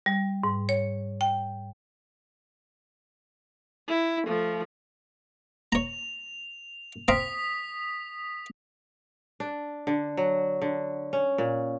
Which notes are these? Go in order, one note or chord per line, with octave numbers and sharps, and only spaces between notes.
G3
G#2
C#5
G5
E4
F3 A3
C#5 A#5 F7
C4 F5 A#5 D#6 B6
D4
D3
F#3
D3
C#4
A#2